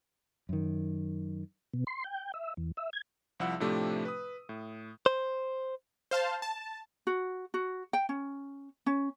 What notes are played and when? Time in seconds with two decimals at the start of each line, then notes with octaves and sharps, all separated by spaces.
0.49 F#2 D#3
1.74 B2
1.87 C6
2.04 G5
2.34 E5
2.57 E2
2.77 E5
2.93 G#6
3.40 C2 F3 E4 F#5 E6
3.60 A2 C3 F3 A3 D4 G4
4.05 B4 D#6
4.49 A2
5.06 C5
6.11 C5 F5 A5
6.42 A5
7.07 F#4
7.54 F#4
7.93 G5
8.09 C#4
8.86 C#4